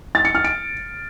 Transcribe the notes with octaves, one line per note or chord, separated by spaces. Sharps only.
A6
C#7
F6
D7